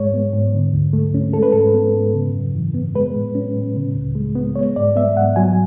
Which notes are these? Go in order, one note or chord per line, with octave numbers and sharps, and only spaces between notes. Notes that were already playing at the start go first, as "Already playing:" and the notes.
Already playing: G#2 G#3 C#5
B3
G#2
D3
D2
A3
C#4
G#3 A4
B4
G#2 A4
B3
G#2
C#3
F#2
E3
B3
G#3 B4
A2
C#4
A2
C#3
C#2
G#3
B3
G#3 C#5
G#2 D5
B3 E5
G#2 F#5
F#3 G#5